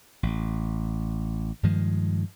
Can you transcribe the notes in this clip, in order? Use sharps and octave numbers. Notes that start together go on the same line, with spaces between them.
A1
G2 D#3 F3 G#3